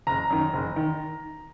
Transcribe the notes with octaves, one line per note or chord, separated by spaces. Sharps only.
F#1 A#5
F#2 D#3
F#1
D#3